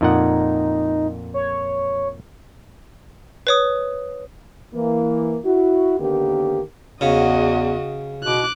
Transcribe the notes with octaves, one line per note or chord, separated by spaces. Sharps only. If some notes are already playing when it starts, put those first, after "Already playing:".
F2 A#2 D#4 F#5
C#5
B4 C#5 D#6
E3 A#3
E4 F#4
D3 D#3 A#3 B3 G4
E2 C#3 F#4 D#5
B2 D6 F#6